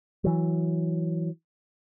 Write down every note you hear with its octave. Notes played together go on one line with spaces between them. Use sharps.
E3 F#3